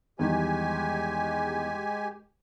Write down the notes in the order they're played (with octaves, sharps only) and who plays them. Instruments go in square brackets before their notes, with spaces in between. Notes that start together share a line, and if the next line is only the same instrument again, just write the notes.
[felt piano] E2 D#3 G3 [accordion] G#3 G4 G#5